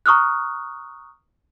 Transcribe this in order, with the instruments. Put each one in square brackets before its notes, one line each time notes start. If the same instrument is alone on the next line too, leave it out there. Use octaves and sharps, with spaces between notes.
[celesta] A#5 C#6 D#6 F6 F#6